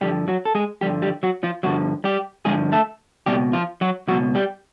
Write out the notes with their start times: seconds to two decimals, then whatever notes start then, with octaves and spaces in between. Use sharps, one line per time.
0.01 G2 D3 F3 G3 G4
0.28 F#3 F#4
0.45 A4
0.55 G#3 G#4
0.81 G2 D3 F3 G3 G4
1.02 G3 G4
1.23 F#3 F#4
1.43 F3 F4
1.63 G2 D3 F3 F#3 F#4
2.04 G3 G4
2.45 G2 D3 F3 G#3 G#4
2.72 A3 A4
3.26 C#2 B2 G3 G4
3.53 F3 F4
3.81 F#3 F#4
4.08 C#2 B2 F#3 F#4
4.35 G3 G4